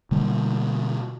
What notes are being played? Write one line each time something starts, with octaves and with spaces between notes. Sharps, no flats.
B2 D3 G3 A#3